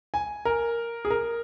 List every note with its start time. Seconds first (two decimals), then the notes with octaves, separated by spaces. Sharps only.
0.14 G#5
0.45 A#4
1.05 G#4
1.10 A#4